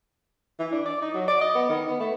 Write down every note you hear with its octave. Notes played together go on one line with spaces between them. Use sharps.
E3
D4
D5
D#4
F#3
D5
D#5
B3
D#3
B3
A3